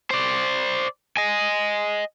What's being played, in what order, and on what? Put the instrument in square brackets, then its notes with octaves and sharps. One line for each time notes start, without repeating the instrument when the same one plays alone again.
[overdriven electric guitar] C5 D5
D#5 G#5